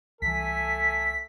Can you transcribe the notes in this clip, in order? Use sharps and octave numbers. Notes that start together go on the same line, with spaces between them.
C2 E3 A3 A4 G#5 B6